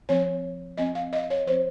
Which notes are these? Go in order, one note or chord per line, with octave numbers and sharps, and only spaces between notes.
F3 C4 C#5
F3 C4 D#5
F5
D#5
C#5
F3 C4 C5